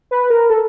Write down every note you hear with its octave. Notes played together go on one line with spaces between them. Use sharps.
B4
A#4
A4